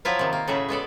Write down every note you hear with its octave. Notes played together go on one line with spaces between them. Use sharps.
F3 F#3 E4 F4 E5 F5
C3 D#3
A#3
A2 C#3 F#4 G#4 E5
G#3 B3 A4 D5